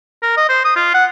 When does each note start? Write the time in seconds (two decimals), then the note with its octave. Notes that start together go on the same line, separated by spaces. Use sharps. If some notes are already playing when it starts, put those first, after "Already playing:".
0.22 A#4
0.37 D#5
0.49 C5
0.65 D#6
0.76 F4
0.94 F#5